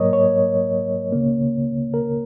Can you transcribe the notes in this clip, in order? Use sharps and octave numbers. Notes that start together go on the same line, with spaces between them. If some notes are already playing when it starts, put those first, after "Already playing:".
Already playing: G#2 F#3 A#3 A#4 C#5 D#5
C#5
C#2 C#3 A#3
A#4